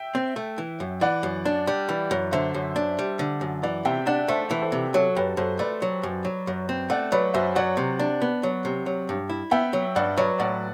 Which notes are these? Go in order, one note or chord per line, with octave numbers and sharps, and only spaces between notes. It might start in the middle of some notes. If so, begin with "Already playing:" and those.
Already playing: E5 G5
C4
A3
E3
F#2
E3 D5 F#5
F#2
D4
G3
E3
F#2
D3 C5 E5
F#2
D4
G3
D3
F#2
E3 D5 F#5
C3 E5 G5
D4 D5 F#5
A3 C5 E5
E3
A4 C5
C3
F#3 F#4 A4
F#2 G4 B4
F#2 A4 C5
A3 B4 D5
F#3
F#2
F#3
F#2
C4
A3 D5 F#5
F#3 B4 D5
F#2 C5 E5
F#3 D5 F#5
C3
D4
B3
F#3
C3
F#3
G2
E4
B3 E5 G5
F#3
G2 D5 F#5
F#3 B4 D5
A2 D5 F#5